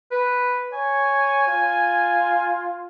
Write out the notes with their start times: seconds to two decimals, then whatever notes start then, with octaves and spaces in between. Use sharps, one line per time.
0.11 B4
0.73 C#5 G#5
1.48 F4